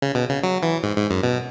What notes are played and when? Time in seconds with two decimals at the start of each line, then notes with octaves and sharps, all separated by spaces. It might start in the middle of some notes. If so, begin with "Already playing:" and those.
0.02 C#3
0.15 B2
0.29 C#3
0.43 F#3
0.63 E3
0.83 G#2
0.97 G#2
1.11 F#2
1.23 B2